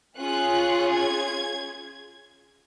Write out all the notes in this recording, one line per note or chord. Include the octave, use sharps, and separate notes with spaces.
C#4 F4 G#4 F#6
G#6